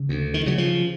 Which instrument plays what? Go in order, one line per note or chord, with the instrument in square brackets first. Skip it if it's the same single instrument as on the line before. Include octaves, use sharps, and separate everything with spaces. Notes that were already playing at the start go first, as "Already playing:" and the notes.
Already playing: [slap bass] C#3
D2
D#3
C#3 F#3
F3